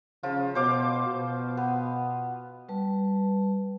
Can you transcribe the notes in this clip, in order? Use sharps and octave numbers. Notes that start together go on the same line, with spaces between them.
C#3 F3 F4
B2 C5 F5 D6
B2
B3
G3 B4 A5